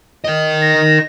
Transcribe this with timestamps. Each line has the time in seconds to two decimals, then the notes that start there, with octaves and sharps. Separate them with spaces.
0.25 A#4 D#5
0.62 A#6